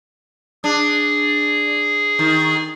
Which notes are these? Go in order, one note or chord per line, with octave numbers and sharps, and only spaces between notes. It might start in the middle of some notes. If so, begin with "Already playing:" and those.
D4 G#4
D#3